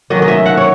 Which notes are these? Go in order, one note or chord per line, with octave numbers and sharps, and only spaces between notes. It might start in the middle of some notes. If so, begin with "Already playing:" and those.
D#3 F#3 C#4 D#5
D#5
E5
F#5
C#5